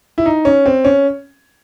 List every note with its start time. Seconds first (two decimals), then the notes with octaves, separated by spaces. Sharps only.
0.18 E4
0.26 D#4
0.45 C#4
0.66 C4
0.85 C#4